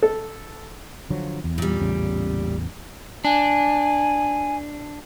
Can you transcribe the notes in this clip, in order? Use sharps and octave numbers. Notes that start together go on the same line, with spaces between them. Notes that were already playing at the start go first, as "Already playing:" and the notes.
A4
D3 F3 F#3
E2
A#2 G3
A1 E2 C#3
D4 G#5